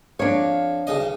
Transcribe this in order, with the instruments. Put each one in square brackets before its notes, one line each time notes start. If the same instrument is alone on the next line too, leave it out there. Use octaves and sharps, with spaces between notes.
[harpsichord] F2 [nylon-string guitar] D4 C#5 [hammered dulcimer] F5 A#5
[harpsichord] B1 C#3 D#5